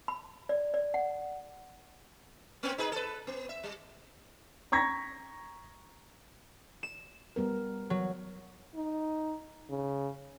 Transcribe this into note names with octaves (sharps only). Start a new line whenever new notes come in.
B5
D5
D5
F#5
A#3 C4 C#4
D#4 G#4 B4
A4 B4
B3
E5
G3
A#5 C#6 G#6 A#6 B6
E7
G3 B3 A#4
F#3
D#4
C#3